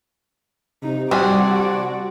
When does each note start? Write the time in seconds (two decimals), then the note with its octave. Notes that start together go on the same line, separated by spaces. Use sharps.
0.83 C3 D#4
1.11 G3 C4 D4 F#4 D5 G#5